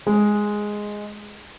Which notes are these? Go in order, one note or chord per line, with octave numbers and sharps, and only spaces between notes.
G#3